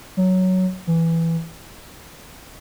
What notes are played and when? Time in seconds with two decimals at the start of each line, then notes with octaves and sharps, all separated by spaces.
0.17 F#3
0.87 E3